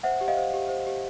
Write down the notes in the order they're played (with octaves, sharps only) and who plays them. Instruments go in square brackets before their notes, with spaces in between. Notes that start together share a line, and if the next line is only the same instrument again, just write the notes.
[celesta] C5 E5 F#5
G4
D#5 F5
C5
G4
C5
G4